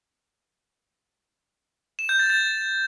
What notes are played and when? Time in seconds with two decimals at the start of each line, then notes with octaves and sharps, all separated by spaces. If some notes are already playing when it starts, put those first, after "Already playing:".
1.99 E7
2.09 G6
2.19 A6
2.30 A6